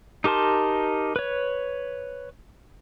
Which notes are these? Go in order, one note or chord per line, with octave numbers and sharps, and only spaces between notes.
D#4 G4 A#4 A5 C6
B4 C#5